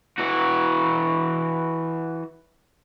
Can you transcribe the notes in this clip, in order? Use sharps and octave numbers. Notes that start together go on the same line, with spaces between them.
E3 F#4